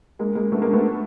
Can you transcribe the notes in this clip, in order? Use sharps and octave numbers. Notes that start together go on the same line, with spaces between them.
G#3 A#3
G#3 A#3
A3 B3
G#3 A#3
A3 B3